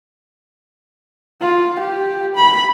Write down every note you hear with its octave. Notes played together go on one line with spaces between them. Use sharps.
F4
G4
B5